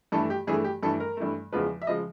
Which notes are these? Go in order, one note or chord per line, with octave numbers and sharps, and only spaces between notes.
G2 E3 A3 A4
G4
G2 E3 A3 G#4
G4
G2 E3 A3 A4
A#4
G2 E3 A3
E2 C#3 F3 G#3 B4
E5
C#3 F3 G#3 D#5